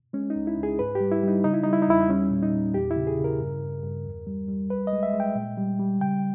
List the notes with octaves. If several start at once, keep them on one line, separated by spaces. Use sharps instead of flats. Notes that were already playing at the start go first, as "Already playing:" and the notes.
G#3 C#4
D#4
C#2
E4
C#2
G#4
G#2 B4
G4
G3
E4
G3 D#4
C#3 D#4
E4
G3 D#4
E4
D#4
E2 E4
D#4
G3 C#4
A#2
D#4
A#2
E2 G4
E4
C#3
G#4
C#3
A#4
G2
G2
G2
E2
G3
G3
C#2 B4
D#5
G#3
E5
G#3
G5
A#2
G3
G3
C#3 G5